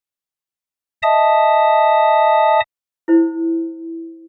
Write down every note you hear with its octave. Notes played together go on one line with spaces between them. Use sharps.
D#5 E5 A5 D#6
E4 C5